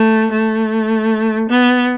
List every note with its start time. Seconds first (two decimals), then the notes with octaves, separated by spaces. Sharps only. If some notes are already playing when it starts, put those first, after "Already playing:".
Already playing: A3
0.31 A3
1.49 B3